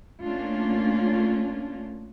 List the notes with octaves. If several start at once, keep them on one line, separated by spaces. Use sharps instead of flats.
A3 A#3 C#4 D4 F4